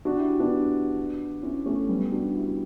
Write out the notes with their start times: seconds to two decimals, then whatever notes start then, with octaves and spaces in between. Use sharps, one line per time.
0.05 D4 F#4
0.17 E4 G4
0.40 B3 D4
1.43 C#4 E4
1.66 A3 C#4
1.89 G3 B3
2.12 D4 F#4
2.35 E4 G4